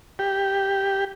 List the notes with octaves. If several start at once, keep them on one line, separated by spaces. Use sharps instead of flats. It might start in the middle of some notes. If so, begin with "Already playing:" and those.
G4